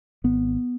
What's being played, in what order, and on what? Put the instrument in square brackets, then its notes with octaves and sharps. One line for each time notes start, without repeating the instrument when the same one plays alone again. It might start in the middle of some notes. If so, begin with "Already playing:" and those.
[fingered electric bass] G#1 B3